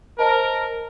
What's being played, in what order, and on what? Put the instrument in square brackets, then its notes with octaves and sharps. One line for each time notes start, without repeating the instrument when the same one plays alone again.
[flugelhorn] A#4 [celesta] C5 D#5 A5